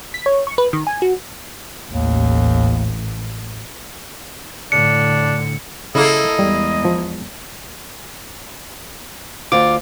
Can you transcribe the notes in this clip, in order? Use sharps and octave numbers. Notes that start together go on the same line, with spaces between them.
B6
C#5
C#6
B4
D#3
G#5
F#4
A1 D#2
A2 D3 D4 C#7
C#3 A#3 E4 A4 D#5
E2 G3 G#3
F3
D2 F4 D6